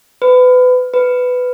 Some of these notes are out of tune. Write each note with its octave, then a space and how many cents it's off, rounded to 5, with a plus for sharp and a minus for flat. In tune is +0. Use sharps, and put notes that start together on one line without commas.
B4 +30
B4 +15